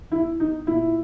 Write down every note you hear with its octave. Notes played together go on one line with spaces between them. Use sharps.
E4
D#4
A#2 E4